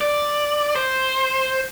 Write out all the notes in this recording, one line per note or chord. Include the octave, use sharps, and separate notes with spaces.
D5
C5